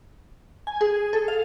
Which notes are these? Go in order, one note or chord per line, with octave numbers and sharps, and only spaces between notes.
G#5
G#4
A4
F5